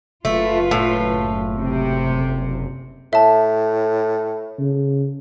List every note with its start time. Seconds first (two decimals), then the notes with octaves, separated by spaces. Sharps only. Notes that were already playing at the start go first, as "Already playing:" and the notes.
0.25 F#1 A3 F4 B4
0.71 A2
1.58 C3
3.13 A2 E5 A5
4.59 C#3